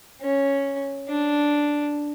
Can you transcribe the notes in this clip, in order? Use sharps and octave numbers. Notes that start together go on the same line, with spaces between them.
C#4
D4